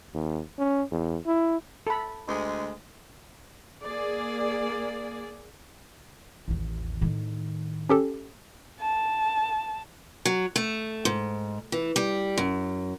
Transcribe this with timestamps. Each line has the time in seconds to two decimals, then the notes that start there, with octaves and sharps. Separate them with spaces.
0.13 D#2
0.58 C#4
0.91 E2
1.26 E4
1.87 A4 B5
2.27 D2 G#3
3.83 A#3 G#4 D5
6.48 A1 D#2
7.01 A2 D#3
7.89 C#4 G4 A4
8.81 A5
10.25 F#3
10.56 A3
11.05 G#2
11.72 E3
11.96 G3
12.38 F#2